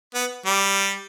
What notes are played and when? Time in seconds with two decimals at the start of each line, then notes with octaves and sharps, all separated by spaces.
0.14 B3
0.46 G3